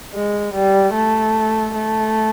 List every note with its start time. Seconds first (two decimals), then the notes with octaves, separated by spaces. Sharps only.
0.14 G#3
0.54 G3
0.94 A3
1.74 A3